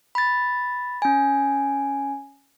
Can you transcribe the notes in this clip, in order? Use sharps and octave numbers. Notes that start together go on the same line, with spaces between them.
B5 A6
C#4 G#5